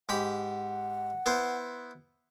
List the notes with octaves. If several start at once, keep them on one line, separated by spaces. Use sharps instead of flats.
G#2 G4 F#5 B5
B3 E4 C5